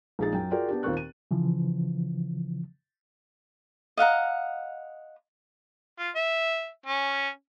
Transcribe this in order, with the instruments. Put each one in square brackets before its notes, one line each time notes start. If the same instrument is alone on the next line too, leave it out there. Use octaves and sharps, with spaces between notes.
[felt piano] A#1 G#3 D#4 G#4 A6
F#2 G5
F4 F#4 G#4 A#4 D5 G5
B3 D4 G4
D#2 A#2 C4 A#4 C#6 F#6
D#7
[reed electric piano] C#3 E3 F3
[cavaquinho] D#5 F5 F#5 A#5
[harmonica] F4
E5
C#4